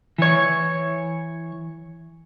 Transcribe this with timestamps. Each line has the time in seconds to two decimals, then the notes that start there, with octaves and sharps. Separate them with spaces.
0.18 E3 C#5